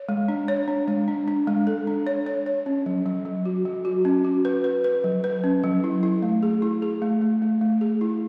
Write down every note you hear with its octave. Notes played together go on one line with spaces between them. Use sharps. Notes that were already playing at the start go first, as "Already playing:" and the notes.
Already playing: C#5
G#3
D4
C#5
D4
G#3
D4
D4
G#3
A4
D4
C#5
C#5
C#5
C#4
F#3
F#3
F#3
F#4
F#3
F#4
C#4
F#4
B4
B4
B4
F#3
B4
C#4
F#3
E4
E4
A3
G#4
E4
G#4
A3
A3
A3
A3
G#4
E4